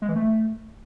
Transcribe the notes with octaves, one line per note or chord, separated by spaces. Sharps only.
G#3
E3
A3